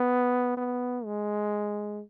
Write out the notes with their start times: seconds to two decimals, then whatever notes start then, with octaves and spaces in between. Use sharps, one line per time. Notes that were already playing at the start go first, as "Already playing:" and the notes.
Already playing: B3
0.57 B3
1.05 G#3